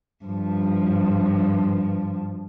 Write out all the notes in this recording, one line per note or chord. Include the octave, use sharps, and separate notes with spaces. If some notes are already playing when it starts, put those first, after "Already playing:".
G2 F3